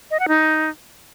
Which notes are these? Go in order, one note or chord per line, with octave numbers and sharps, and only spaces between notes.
D#5
F#5
D#4